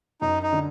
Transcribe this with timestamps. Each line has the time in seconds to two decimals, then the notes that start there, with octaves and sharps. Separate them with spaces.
0.21 F#2 D#4
0.43 D#4
0.53 D3